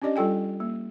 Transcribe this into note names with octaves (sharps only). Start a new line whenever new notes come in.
C#4 D4 G4 D5 D#5
G3 F4 A4 G5 G#5
A#3